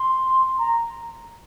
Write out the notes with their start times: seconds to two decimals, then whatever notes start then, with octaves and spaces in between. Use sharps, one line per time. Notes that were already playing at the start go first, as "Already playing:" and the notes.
Already playing: C6
0.58 A#5